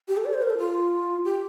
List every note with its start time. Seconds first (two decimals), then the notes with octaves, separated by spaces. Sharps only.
0.08 G4
0.17 A4
0.25 D5
0.34 C5
0.42 A#4
0.50 A4
0.59 F4
1.25 G4